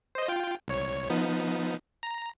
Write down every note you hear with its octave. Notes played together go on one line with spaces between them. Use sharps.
C5 D#5
F4 G5
C2 C#5
F3 B3 D#4
A#5